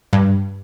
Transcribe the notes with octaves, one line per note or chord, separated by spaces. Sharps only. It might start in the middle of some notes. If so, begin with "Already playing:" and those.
G2